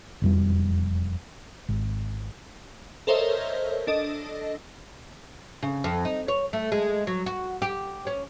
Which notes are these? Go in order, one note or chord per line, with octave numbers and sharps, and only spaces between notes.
E1 F2 G3
G#1
A4 A#4 C5 C#5 D#5 E5
D4 A4 D#5
C#3
F2
D#4
C#5
A3
G#3
F#3
F#4
G4
C#4